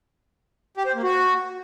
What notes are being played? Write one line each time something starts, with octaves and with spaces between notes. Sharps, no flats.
G4
C5
A#3
F#4